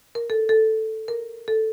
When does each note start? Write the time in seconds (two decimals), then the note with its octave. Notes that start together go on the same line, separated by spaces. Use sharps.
0.15 A#4
0.30 A4
0.49 A4
1.08 A#4
1.48 A4